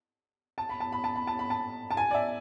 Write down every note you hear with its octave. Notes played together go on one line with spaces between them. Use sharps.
A5
B5
A5
B5
A5
B5
A5
B5
A5
A5
G#5
D5
E5